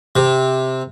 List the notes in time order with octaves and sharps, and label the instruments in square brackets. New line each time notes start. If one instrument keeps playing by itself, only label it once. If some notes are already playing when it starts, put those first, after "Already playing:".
[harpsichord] C3